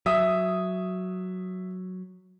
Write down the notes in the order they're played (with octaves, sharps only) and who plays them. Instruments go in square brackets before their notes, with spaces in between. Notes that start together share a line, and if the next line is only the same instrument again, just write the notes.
[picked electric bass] F#3 [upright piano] E5 D#6